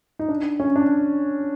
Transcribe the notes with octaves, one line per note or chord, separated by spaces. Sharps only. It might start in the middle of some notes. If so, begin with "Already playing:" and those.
D#4
D4
C#4
D4